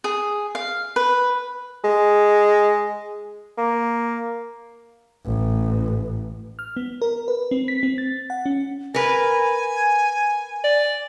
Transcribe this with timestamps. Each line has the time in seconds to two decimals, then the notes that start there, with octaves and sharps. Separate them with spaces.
0.04 G#4
0.55 F5
0.96 B4
1.84 G#3
3.58 A#3
5.25 A1
6.59 F6
6.77 B3
7.02 A#4
7.28 B4
7.51 C4
7.68 B6
7.83 C4
7.98 A6
8.30 F#5
8.46 C#4
8.94 A#4 B4 G#5
10.64 D5